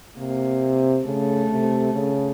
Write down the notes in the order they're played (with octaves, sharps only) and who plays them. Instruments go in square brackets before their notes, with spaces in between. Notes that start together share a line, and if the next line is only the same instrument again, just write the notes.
[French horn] C3 [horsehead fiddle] A#3
[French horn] C#3 [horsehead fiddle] A3
[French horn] C3
C#3